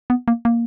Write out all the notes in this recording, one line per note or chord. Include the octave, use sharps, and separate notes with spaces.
B3
A#3
A#3